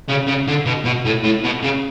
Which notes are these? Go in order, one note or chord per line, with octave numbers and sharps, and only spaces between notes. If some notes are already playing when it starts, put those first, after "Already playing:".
C#3
C#3
D3
B2
B2
A2
A2
B2
C#3